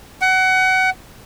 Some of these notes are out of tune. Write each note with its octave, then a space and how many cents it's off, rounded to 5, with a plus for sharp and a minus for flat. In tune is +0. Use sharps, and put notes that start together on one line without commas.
F#5 +25